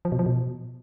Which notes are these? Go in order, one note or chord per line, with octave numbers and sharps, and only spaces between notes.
F3
B2
F3
B2